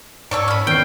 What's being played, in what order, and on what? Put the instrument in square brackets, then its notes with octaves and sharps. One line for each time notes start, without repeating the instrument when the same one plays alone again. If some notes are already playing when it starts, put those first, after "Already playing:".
[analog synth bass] G#2 [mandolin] A4 C#5 C#6 [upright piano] D5
[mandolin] C#4 B5
[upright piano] E2 C7 [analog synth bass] D#3 [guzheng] G5